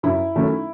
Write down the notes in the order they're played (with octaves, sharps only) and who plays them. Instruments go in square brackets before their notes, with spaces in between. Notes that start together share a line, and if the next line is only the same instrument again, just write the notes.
[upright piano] F#2 [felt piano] E4
[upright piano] D#3 F#3 A3 C#4